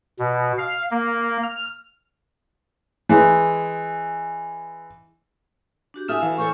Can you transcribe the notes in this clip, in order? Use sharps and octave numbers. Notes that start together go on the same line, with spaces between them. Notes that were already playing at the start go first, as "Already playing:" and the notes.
B2
F5
A#3
F6
E3 G#3
D4 F#4 G4
E4 F#4 A4 E5 G#5 D#6 F6 E7
E3 F5
A4 C5 C#5 C#6